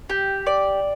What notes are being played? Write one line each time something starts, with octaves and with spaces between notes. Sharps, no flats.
G4
D5